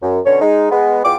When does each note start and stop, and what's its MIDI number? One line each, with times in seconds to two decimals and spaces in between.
0.02 0.20 42
0.25 0.39 47
0.25 0.39 50
0.25 0.39 61
0.25 0.39 73
0.41 0.68 56
0.41 0.68 63
0.71 1.01 56
0.71 1.01 59
1.04 1.16 40
1.04 1.16 59
1.04 1.16 65
1.04 1.16 68
1.04 1.16 79
1.04 1.16 86